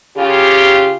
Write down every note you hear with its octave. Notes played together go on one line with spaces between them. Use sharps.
C#3 F4 G4